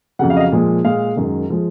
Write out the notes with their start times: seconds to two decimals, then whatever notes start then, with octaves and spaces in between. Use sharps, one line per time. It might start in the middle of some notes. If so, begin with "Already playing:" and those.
0.19 F2 C#3 F#3 F#5
0.30 F5
0.36 D#5
0.40 F5
0.52 A#2 F3 G#3
0.84 A#2 G#3 F5
1.16 F#2 D#3 G#3
1.50 F3 G#3